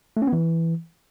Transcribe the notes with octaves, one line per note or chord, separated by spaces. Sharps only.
A3
C#4
B3
E3